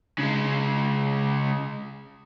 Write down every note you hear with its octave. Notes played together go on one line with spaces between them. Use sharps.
C#3 G#3